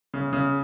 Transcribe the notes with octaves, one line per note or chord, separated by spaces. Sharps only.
C#3
C#3